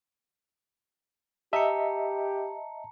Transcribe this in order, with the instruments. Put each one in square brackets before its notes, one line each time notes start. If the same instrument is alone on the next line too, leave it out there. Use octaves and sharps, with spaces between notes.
[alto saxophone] G4 [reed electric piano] D#5 E5 [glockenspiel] A5 A#5 C#7